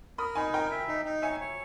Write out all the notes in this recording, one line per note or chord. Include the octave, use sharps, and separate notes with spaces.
A#4 B5 D#6
D#4 G#5 B5
A#4 G5 A#5
E5
D#4
D#4
C#5 E5 G#5
C#5